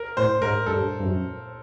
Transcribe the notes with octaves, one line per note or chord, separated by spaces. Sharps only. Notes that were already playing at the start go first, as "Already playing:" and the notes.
Already playing: A#4
A2 C5
G#2 A#4
G2 A4
G2
F#2